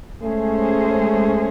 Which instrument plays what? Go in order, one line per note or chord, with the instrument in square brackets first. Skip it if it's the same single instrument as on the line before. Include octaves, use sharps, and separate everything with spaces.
[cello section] G#3 C#4 G#4 C5 [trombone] A3